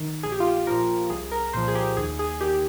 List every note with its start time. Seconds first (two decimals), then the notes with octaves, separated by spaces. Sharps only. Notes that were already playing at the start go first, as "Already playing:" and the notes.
Already playing: D#3
0.23 A#1 G#4
0.32 G4
0.40 F4
0.48 G4
0.67 A#2 F3 A#4
1.10 C2 G#4
1.32 A#4
1.53 A#2 F3 C5
1.68 G#4
1.75 G4
1.97 D#2 G#4
2.19 G#4
2.41 D#3 G4